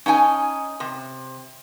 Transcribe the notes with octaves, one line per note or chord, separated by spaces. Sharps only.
C#4 D#4 G5 G#5
C3